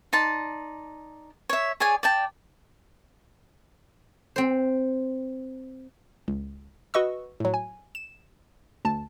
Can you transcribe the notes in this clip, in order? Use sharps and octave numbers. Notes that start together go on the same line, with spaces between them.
D#4 D5 A5 C6
C#5 E5
G#4 C#5 D5 G#5
D5 G5 A5
C4 C5
C#2
F#4 B4 D#5 C#6 E6
A2 F#3
G#5
E7
D2 A5